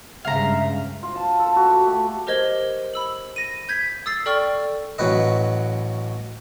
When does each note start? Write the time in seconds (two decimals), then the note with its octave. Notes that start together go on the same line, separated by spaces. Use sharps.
0.25 G2 C#3 G#3 E5 F5 A#5
1.03 F4
1.15 A5
1.39 A4
1.56 F#4
1.70 G4
1.87 A3
2.27 G4 A#4 C5 D#5 G#6 G7
2.94 B5 E6 F#7
3.36 A#6 D#7
3.69 G6 G#6 B6
4.06 D#6 E6 A6 C7
4.26 A4 D5 G5 C#6 F6
4.98 A1 F#3 B4 D#5